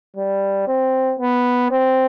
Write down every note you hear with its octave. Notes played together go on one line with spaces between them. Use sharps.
G3
C4
B3
C4